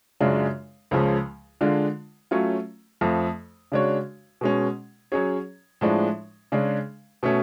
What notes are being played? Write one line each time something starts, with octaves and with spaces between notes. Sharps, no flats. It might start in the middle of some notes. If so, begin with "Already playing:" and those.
F#2 C#3 G#3 D4 F4
C#2 C#3 F3 G#3
D3 G#3 D4 F4
F#3 A3 C#4 F4
F2 F3 A3
C#3 G#3 D4 F#4 C#5
B2 G#3 C#4
F#3 C#4 G#4 C#5
A2 F3 G#3 D4
C#3 G#3 D4 G#4
B2 A3 C#4